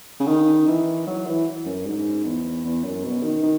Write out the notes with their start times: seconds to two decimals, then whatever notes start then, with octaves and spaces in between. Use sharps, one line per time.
0.20 C#3
0.28 D#3
0.68 E3
1.07 F#3
1.27 E3
1.65 F#2
1.86 G#2
2.25 E2
2.65 E2
2.84 F#2
3.04 B2
3.23 D#3
3.43 D#3